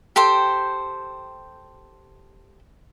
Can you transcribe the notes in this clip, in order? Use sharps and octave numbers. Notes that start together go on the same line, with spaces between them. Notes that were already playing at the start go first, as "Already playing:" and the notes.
G4 A4 C5 G5